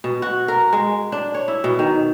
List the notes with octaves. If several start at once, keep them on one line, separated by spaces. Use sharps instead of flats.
B2
F#4
A#4
G#3
D4
C#5
E4
B2
D#3